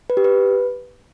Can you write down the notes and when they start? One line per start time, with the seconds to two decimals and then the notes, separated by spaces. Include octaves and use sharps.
0.10 B4
0.17 G4
0.24 B4